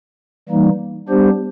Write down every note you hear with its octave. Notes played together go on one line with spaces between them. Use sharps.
E3 G3 A#3 D#4
G3 B3 D4 G4 C5